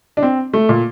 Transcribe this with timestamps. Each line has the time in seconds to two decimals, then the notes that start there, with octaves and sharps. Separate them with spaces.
0.17 D4
0.23 C4
0.54 A3
0.69 A#2